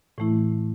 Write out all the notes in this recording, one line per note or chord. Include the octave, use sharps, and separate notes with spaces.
A2 E3 A3 E4